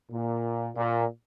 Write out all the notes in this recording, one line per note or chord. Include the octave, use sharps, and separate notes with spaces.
A#2
A#2